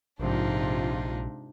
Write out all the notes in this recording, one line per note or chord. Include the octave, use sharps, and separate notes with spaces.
A#1 G#2 C3 D4 D#4 F4